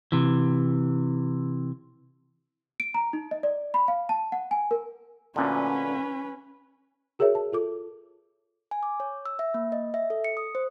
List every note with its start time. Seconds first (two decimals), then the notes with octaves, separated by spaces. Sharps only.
0.12 C3 E3
2.80 D7
2.94 A#5
3.13 D#4
3.31 D#5
3.43 D5
3.74 B5
3.88 F5
4.09 A5
4.32 F#5
4.51 G#5
4.71 A#4
5.36 D2 A#2 D3 C#4 B4
7.19 F#4 G#4 A#4 C#5 E5
7.35 A5
7.52 F4 A4 D6
8.71 G#5
8.83 D6
9.00 C#5
9.25 E6
9.39 E5
9.54 A#3
9.72 D#5
9.94 E5
10.10 A4
10.24 C#7
10.37 D#6
10.55 C5